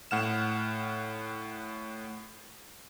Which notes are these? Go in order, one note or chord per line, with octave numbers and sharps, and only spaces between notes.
A2 F#5 F6 E7